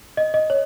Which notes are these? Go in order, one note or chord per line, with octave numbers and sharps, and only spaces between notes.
D#5
D#5
C#5